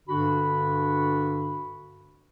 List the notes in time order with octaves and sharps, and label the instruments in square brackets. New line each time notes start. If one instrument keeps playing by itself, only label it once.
[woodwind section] G2 D3 D4 F#4 B5